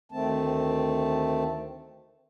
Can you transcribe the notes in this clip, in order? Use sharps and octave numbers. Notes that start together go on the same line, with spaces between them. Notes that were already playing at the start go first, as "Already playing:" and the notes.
D2 D#3 A3 C4 A5